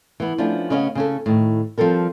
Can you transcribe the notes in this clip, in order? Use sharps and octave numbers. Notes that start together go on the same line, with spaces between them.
E3 B3
F3 A3 B3 C#4 D4
C#3 B3 C#4 D#5 F5
C#3 C#4 A4
A2 D#3
F3 G3 C4 A4 A#4